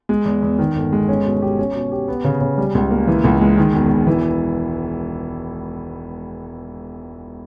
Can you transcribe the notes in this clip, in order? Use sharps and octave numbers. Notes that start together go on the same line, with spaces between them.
G#3
E2
E2
D#3
G1
G#3
C#4
B2
G4
C#4
B2
G4
B3
C#3
C#3
G3
C#2
A#3
E3
C#2
G#3
D#3
E1
E1
E3